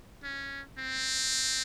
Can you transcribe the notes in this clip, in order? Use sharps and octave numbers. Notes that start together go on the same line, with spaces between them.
C#4
C4